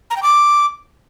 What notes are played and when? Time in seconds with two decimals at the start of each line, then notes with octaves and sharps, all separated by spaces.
0.10 A#5
0.16 G5
0.23 D6